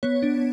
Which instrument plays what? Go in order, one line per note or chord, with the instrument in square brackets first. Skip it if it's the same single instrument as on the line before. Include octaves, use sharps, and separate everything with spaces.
[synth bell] B3 C#5
D4